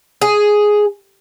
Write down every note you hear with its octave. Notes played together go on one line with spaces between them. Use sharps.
G#4